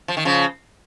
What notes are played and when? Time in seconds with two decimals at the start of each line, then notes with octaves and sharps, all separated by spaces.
0.08 F3
0.17 D#3
0.25 C#3 F3